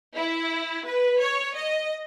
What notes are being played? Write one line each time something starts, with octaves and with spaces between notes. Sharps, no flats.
E4
B4
C#5
D#5